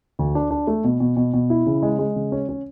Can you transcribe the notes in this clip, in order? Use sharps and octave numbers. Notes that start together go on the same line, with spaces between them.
D2
D4
D4
A3
B2
B2
B2
B2
E4
C#3
G#3
G#3
C#3
C#4
C#4